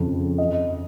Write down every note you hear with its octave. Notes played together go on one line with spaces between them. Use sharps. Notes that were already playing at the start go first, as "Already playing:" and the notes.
Already playing: F2 C#3
D#5